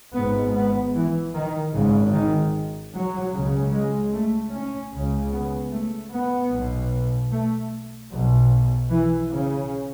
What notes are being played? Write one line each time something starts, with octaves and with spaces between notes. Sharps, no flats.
G#1 G#2 B3
B3
E3
D#3
G#1 G#2 C#3
D#3
F#3
C#2 C#3
G#3
A3
C#4
C#2 C#3
B3
A3
B3
B1 B2
A3
B1 B2
E3
C#3